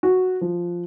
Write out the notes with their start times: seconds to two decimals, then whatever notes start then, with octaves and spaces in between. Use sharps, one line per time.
0.03 F#4
0.41 F3